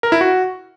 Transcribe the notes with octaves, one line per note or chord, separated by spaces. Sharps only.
A#4
E4
F#4